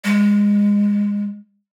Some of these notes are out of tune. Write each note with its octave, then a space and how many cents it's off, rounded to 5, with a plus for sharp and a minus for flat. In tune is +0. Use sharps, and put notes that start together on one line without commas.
G#3 -20